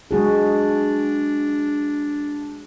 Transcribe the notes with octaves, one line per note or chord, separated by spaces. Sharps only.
G#3 D4 F#4 G#4